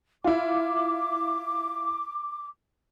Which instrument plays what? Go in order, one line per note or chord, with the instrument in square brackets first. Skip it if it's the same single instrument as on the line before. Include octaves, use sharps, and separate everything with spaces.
[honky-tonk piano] E4 F4 [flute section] D6